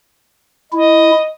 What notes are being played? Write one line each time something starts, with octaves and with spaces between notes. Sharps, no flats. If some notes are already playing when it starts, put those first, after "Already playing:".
E4 D#5